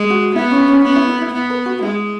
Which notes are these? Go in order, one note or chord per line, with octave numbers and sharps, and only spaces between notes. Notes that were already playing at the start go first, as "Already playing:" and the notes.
Already playing: G#3
F#4
B3 E4
C#4
C#4
B3 C#4
E4
E4
E4
B3
B4
F#4
G#3 E4